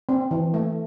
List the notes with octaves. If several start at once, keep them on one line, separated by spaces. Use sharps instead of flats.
C4
E3
A3